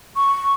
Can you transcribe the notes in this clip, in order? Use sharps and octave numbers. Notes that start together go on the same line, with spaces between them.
C#6